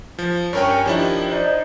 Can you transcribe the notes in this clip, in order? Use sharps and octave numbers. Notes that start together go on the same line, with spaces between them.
F3
G2 C#4 A#4 C#5 G5
D#3 F3 D4 E4 G4
D#4 C5 D5